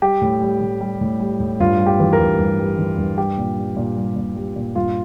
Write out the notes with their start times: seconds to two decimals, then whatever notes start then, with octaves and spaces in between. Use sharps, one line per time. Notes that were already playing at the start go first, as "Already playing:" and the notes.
0.02 G3 G4
0.22 A2
0.42 G3
0.61 A2
0.81 G3
1.01 A2
1.20 G3
1.40 A2
1.60 G2 F4
1.79 G3
1.86 G4
2.00 E3
2.13 A#4
2.20 G2
2.39 G2
2.59 G3
2.78 E3
2.98 G2
3.18 G3 G4
3.38 A#2
3.57 G3
3.77 A#2
3.97 G3
4.16 A#2
4.36 G3
4.56 A#2
4.75 G2 F4